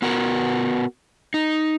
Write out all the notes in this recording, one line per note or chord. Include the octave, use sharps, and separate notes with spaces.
B3 F#4 A#4
D#4